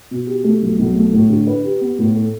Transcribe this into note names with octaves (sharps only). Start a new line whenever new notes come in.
B2
G4
A3
B1
B1
A3
A2
D3
B4
G4
B3
A2
A4